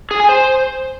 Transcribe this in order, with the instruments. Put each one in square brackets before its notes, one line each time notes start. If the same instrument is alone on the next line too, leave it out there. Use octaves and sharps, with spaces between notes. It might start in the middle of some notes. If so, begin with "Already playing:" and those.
[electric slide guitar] G#4
G#5
C5